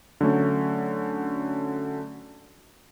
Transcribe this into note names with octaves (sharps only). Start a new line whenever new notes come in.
D3 F#3 A3 C#4